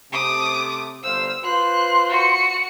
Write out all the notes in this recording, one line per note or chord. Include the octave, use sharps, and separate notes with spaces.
C3 A3 D6 D#6
G1 C5 F5 E6
F4 B4 C5 C6 F#6
F#4 C#7